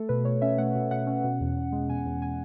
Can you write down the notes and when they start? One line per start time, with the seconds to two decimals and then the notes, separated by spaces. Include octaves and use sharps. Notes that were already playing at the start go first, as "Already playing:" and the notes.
Already playing: A3 A4
0.09 B2 B4
0.25 B2 C#5
0.42 C#4 E5
0.58 A3 F#5
0.75 B2
0.91 B2 F#5
1.07 C#4
1.24 B2
1.41 E2
1.57 E2
1.72 G#3
1.89 B2 G#5
2.06 E2
2.22 G#5